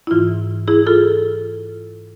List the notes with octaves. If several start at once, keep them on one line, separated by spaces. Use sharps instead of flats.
E4
G#2 E3 F4
E4 G#4
F4 A4